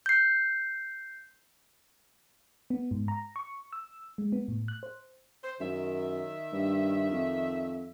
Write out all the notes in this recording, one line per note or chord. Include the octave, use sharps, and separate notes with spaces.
G6 C7
B3
G#2
A#5
C#6
E6
G#3
B3
A2
F#6
C5
C5
F#2 D#3 E5
G2
F2